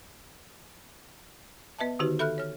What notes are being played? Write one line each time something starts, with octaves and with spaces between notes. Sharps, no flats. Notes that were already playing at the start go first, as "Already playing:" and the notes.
B3 B4 D#5 E5 A5
D3 D#3 D#4 F#4 G4 B4
A4 E5 B5 F6 F#6
C#5 F6